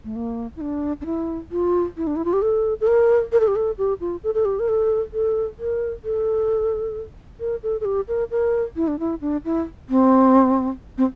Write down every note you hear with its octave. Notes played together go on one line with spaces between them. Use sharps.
A3
A#3
E4
D4
D4
E4
F4
E4
D4
E4
F4
G4
A4
A4
A#4
A#4
A4
G4
A4
G4
F4
A4
A4
G4
A#4
A4
A4
A#4
A4
A#4
A4
A4
G4
A#4
A#4
E4
D4
E4
D4
E4
C4
C4